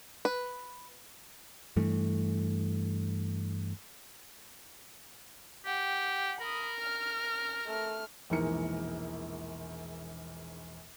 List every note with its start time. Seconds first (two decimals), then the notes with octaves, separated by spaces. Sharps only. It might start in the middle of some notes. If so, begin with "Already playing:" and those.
0.25 B4
1.77 G2 E3 A3
5.65 G4 F#5 G5
6.41 A#4 B5 D#6
6.78 F6
7.66 A3 F6
8.30 E1 A#1 G#2 E3 A#4 C#7